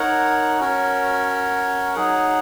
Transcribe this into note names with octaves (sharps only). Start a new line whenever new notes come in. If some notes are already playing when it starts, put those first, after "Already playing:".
Already playing: D#4 A#4 C#5 F#5
C#4 F#4 A#4 C#5
F#3 D#4 G#4 F#5